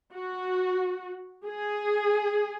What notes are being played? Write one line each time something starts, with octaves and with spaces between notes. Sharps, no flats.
F#4
G#4